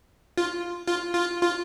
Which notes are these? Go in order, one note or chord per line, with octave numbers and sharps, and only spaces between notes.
F4
F4
F4
F4